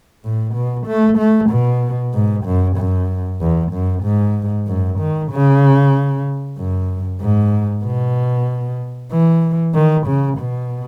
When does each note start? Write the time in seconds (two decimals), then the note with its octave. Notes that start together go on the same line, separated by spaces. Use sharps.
0.24 A2
0.55 B2
0.87 A3
1.18 A3
1.51 B2
2.14 G#2
2.45 F#2
2.77 F#2
3.41 E2
3.72 F#2
4.04 G#2
4.68 F#2
5.00 D#3
5.31 C#3
6.58 F#2
7.21 G#2
7.84 B2
9.12 E3
9.75 D#3
10.07 C#3
10.38 B2